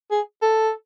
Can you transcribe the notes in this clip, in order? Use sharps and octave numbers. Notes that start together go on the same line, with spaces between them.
G#4
A4